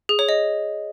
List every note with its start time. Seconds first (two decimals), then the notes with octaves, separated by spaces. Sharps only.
0.09 G#4
0.19 C#5
0.29 D#5